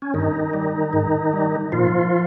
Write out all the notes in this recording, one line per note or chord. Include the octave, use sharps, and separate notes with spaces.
C#4
G2 D#3 D#4
G3
G#2
G3
A#2 F3 F4